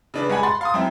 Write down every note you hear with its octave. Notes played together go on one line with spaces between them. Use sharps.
C#3 D4 B4
G2 G#3 F#5 G#5 B5
F#5 B5 C6 A6
F5 C6 D#6
F#2 C4 E4